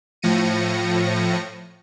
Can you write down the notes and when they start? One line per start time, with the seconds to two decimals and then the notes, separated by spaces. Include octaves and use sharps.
0.22 A2 F3 A#6 C#7 D#7